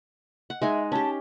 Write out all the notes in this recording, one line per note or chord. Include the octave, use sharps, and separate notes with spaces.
F#5
G#3 D#4 E5 G#5
C#4 G4 A5